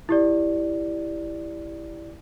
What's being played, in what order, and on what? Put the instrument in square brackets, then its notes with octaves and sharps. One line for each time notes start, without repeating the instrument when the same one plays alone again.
[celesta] E4 G4 D5